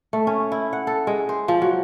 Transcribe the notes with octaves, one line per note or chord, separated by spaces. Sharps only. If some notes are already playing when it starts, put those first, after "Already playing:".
A3
C#4
E4
F#5
A4
G#3
C5
F3
F#3